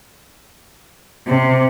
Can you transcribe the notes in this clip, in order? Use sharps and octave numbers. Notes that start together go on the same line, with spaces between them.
C3